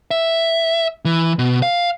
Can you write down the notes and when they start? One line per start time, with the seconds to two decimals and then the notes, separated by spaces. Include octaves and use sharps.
0.11 E5
1.05 E3
1.39 B2
1.62 F5